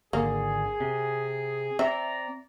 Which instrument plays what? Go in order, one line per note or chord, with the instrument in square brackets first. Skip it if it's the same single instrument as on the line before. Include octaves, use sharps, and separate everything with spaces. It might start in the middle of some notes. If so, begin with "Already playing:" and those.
[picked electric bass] G#1 D3 [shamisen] A#3 [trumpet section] G#4
[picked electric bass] C3
[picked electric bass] C4 [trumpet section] D5 A#5 [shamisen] E5